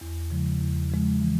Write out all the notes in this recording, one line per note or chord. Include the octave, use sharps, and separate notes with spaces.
E2
C#3 F3 G#3
E2
C#3 F3 G#3
E3